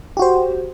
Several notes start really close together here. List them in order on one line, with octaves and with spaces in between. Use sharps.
G4 F#4 C5